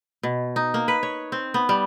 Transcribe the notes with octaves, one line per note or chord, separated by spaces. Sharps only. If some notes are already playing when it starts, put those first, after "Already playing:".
B2
D#4
A#3
B4
C#5
C4
B3
G3